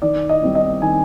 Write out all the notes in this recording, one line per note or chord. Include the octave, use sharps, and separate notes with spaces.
D#3 D5
D#5
G3 C4 D#4
D#5
D#3 G#5